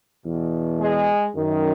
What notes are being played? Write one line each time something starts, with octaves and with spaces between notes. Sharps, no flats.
E2 B2
G#3 G#4
F#2 D#3